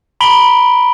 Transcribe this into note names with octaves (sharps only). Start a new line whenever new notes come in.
A#5 B5 B6 D7 G7